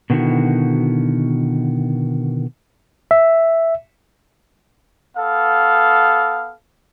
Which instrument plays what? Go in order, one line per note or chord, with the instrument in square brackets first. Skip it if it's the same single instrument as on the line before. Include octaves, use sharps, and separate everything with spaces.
[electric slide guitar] B2 D3 D#3 C4 E4 F#4
[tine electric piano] E5
[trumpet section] B3 A4 F5